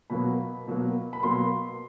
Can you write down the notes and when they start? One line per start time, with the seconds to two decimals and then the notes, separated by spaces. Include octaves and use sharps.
0.10 B2 F#3 A#3 B5
0.67 B2 F#3 A#3
1.13 B5
1.23 B2 F#3 A#3 C6